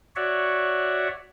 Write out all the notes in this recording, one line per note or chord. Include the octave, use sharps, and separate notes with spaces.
F#4 C#5 D5 E5 F#5